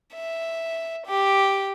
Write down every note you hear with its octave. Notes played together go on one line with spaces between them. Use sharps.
E5
G4